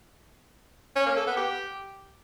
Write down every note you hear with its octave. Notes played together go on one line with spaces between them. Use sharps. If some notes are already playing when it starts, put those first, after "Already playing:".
C#4
A#3
A4
B3
G4